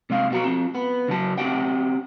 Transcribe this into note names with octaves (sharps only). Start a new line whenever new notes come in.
C3 G#3 F5
B2 F#4 A#5
C4 F4
B3
C#3 F#3 A5
C4 C#4 E4 G4 F#5 G5